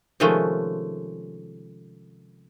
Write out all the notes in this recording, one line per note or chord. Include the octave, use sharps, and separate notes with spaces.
C3 D#3 F3 G#3 A3 C#4